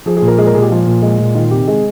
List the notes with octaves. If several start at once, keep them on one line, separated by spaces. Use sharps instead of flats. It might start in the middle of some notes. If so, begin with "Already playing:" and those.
F3 G#4
G#4
A#2
A#4
G#3 G#4
A#4
A#2 G#4
G4
F3 F4
A#2
G#3
A#2
D#3 F4
C3 G4
G#3 G#4